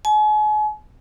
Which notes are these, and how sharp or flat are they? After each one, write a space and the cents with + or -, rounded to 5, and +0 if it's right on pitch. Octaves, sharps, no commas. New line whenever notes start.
G#5 +40